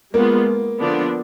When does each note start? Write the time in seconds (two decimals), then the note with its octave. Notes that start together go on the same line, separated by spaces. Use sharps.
0.13 G#3 A#3 B3 F4
0.80 D3 F3 B3 D4